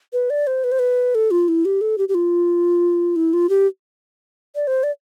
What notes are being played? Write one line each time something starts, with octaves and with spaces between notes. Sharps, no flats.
B4
D5
C5
B4
C5
B4
A4
F4
E4
G4
A4
G4
G4
F4
E4
F4
G4
D5
C5
D5